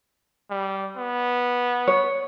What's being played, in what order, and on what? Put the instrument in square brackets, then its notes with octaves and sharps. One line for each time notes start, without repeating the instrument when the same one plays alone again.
[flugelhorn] G3
B3
[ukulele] C#5